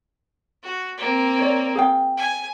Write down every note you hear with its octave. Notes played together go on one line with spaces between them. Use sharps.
F#4
A#3 C4
C#5 D5
G#4 F5 G5
G#5